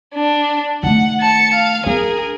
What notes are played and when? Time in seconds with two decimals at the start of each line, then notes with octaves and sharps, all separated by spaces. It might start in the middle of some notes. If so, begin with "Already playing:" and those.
0.15 D4
0.83 D#3 A3 F#5
1.20 A5 C#7
1.53 F5
1.86 D4 G#4 A#4